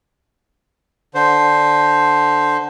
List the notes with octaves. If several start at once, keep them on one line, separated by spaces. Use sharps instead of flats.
D3 C5